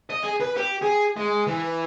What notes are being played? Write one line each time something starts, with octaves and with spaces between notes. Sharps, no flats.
D#5
G#4
B4
G4
G#4
G#3
E3